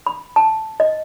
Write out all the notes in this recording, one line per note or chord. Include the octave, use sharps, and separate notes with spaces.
B5
A5
D#5